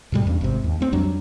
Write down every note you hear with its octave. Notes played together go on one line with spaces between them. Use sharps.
G#2 B2 G3
E2 G2 C#4
G#1 C3
D#2
A3 C4
F2 F#3 G3 D4